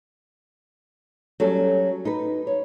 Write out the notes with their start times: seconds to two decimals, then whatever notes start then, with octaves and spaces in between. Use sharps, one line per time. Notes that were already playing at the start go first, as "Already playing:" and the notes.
1.40 F#3 G3 C#4 A4
2.05 D#4 B4
2.47 C#5